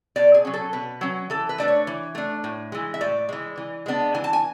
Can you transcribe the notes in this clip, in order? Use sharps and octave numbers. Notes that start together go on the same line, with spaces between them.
B2 D5
G#4
F#3 C#4
A4
B2 B4
F#3 C#4
E3 A4
B4
A3 D4 D5
C#5
E3
A3 D4
A2
E3 G#3
E5
A2 D5
E3 G#3
E3
G#3 B3 D4
E3 G#5
A5
G#5